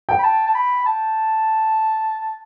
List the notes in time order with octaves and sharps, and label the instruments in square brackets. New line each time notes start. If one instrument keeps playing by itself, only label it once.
[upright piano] G5
[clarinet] B5
A5
A5
B5
A5